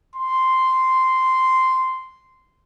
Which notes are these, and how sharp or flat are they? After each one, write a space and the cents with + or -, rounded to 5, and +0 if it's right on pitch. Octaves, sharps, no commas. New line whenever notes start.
C6 -5